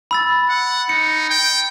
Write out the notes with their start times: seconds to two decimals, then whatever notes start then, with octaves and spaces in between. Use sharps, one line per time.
0.11 B5 E6 A6
0.49 F#5
0.89 D#4 C#7
1.30 G5